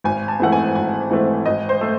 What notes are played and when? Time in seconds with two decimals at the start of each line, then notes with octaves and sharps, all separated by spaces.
0.04 G#1 G#5
0.28 A5
0.40 G#2 E3 A3 C4 F#5
0.52 G#5
0.75 G#1 G#5
1.10 G#2 E3 A3 C4
1.46 G#1 D#5
1.69 C5
1.81 A3